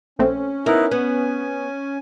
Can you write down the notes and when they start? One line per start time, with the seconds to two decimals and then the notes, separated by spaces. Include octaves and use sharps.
0.19 A#1 A3 C4 C#4
0.66 B3 D#4 E4 A#4
0.91 B3 G#5